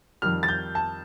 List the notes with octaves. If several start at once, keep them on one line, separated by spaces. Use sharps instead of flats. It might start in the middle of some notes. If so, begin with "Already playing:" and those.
F2 D#3 G3 F6
A6
G6
A5